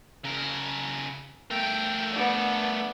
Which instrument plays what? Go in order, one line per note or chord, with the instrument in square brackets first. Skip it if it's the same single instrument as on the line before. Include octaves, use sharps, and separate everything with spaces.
[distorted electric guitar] C#3 A#4
[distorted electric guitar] A3 A#4 [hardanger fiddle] G5
[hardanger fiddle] B3 D4